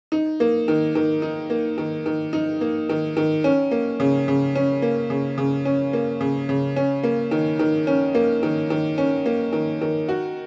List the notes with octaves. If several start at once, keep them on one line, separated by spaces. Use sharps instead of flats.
D#4
A#3
D#3
D#3
D#4
A#3
D#3
D#3
D#4
A#3
D#3
D#3
C#4
A#3
C#3
C#3
C#4
A#3
C#3
C#3
C#4
A#3
C#3
C#3
C#4
A#3
D#3
D#3
C#4
A#3
D#3
D#3
C#4
A#3
D#3
D#3
F#4